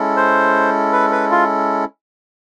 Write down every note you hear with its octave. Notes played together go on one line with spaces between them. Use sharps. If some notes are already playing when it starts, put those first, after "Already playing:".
Already playing: G#3 C#4 E4 A4
C5
B4
B4
F4